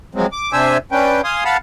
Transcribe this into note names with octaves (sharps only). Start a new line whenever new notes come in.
F3 F#3 G#3 C4
D6
C3 D4 C5 E5 G#5 E6
C#4 D4 B4 G5
F5 G#5 C6 D#6
F5 F#5 A5 B5